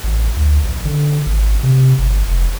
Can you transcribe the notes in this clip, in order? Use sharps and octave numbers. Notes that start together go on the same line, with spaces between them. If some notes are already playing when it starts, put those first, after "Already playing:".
A1
D2
A#1
D3
G#1
C3
G1
F1